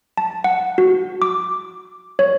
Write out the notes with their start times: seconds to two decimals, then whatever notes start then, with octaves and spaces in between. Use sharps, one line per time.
0.17 A5
0.44 F#5
0.78 F#4
1.22 D6
2.19 C#5